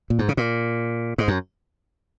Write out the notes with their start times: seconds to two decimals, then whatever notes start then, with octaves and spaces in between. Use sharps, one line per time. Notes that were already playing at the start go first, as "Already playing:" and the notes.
0.10 A#2
0.19 G#2
0.29 C#3
0.37 A#2
1.18 G#2
1.28 F#2